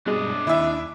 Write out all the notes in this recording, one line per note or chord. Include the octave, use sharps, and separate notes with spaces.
G2 B2 G#3 D4 D#5
D#2 E4 E5